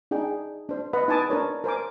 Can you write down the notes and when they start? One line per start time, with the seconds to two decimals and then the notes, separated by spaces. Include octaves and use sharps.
0.11 D4 D#4 G#4 G5
0.69 D4 C5
0.93 B4 D#5 F#5 B5
1.08 D#4 B4 G#5 A5 D6 D#6
1.30 D4 A#4 C#5
1.64 A#4 C5 G#5 D6